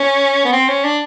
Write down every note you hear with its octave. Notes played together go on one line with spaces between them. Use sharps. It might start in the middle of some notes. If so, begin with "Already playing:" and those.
Already playing: C#4
B3
C4
C#4
D4